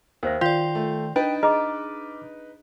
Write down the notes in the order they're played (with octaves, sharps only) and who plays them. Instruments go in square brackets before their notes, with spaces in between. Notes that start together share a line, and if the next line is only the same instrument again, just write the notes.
[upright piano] D#2 [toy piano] A#4 C5 E5
[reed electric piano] D#3 G5 C6 [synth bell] F4 D5 [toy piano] F5 [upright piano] G6
[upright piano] A3
[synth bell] D4 [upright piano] D#4 B4 [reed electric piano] G5
[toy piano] G#4 D#5 A#5 [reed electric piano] D6 F6